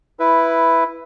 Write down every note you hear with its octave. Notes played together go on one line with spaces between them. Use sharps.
E4 B4